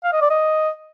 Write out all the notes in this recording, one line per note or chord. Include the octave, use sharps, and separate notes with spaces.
F5
D#5
D5
D#5